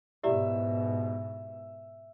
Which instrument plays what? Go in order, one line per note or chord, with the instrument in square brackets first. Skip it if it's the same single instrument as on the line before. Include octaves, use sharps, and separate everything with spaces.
[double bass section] G#2 B2 [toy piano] E4 G4 D5 [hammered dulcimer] E5